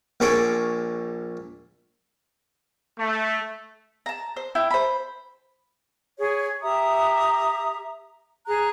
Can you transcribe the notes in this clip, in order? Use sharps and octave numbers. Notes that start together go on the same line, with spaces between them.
A#1 A#2 G#4 A4 C#5 D6
A3
A5 A#5
C5
E4 G5
C5 B5
G#4 C#5
G4 E5 A#5 D#6
G#4 A#5 F#6